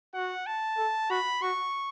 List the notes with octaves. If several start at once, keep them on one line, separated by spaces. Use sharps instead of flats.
F#4 F#5
A5
A4
F#4 B5
F#4 C#6